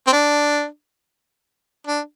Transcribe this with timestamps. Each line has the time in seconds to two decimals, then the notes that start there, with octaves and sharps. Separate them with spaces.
0.07 C4
0.12 D4
1.87 D4